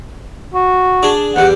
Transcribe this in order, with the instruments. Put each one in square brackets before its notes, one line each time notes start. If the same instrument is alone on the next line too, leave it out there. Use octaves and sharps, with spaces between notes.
[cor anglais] F#4
[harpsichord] D4 G#4
[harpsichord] E2 G3 [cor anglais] F#5